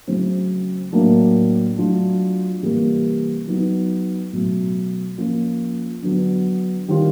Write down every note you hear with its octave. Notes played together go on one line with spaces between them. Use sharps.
C#3 F#3 A3 C4
A2 F#3 A#3 D4
F#3 A3 D4 F4
C3 E3 G3 A#3
F#3 B3 D#4
B2 F#3 A3
F3 A#3 C#4 F4
D3 F#3 B3
D#3 G3 C4 F4